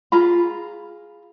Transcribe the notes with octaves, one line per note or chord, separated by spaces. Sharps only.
F4 G#4 A#5 B5